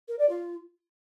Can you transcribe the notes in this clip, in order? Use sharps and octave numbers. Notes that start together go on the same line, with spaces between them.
A#4
D5
F4